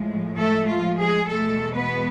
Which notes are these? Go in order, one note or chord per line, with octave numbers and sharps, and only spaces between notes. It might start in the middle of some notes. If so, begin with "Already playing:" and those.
Already playing: A2 F3 G#3
A3 A4
F3 F4
G#3 G#4
E2 B2 G#3 A3 A4
B3 B4